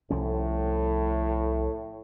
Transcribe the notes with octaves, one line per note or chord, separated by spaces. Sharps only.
C2 A2 F3 C#4